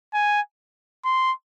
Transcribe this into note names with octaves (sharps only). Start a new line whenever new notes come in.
G#5
C6